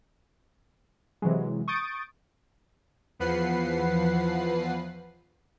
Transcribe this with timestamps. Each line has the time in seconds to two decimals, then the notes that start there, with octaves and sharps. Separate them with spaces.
1.22 C3 E3 F#3 G#3
1.68 C#6 D#6 G6 A6 D7
3.19 E2 F3 B4 F#5 C7